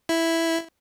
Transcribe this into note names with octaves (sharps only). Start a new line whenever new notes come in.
E4